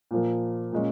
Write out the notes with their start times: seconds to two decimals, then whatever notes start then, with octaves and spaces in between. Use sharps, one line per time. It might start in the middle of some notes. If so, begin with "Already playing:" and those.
0.11 A#2 F3 A#3
0.72 A#2 G#3 C#4